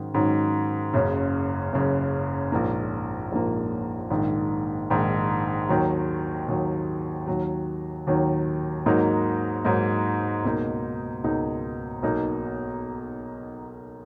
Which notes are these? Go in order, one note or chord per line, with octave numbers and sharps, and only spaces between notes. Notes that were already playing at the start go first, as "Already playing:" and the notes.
Already playing: G#2 D#3 F#3 C#4
G#2 D#3 F#3 C#4
F#1 F#2 C#3
F#1 F#2 C#3
A#1 G#2 F3 A#3
A#1 G#2 F3 A#3
A#1 G#2 D#3
A#1 G#2 D#3
D#2 D#3 F#3
D#2 D#3 F#3
D#2 D#3 F#3
D#2 D#3 F#3
G#2 F#3 A#3 D#4
G#2 F#3 A#3 D#4
C#2 B2 A#3 D#4
C#2 B2 A#3 D#4
B1 B2 A#3 D#4